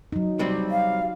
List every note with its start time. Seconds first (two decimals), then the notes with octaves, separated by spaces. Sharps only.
0.12 F#3 D#4
0.39 C3 G3 C4
0.71 F5